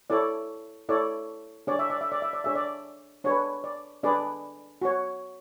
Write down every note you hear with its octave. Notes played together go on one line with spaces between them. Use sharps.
E4 A4 C#5 D5
E4 A4 C#5 D5
D4 G#4 C#5 D5
E5
D5
E5
D5
E5
D5
D4 G#4 C#5 E5
D5
D4 G#4 B4 C#5
D5
D4 G#4 B4 D5
F#4 C#5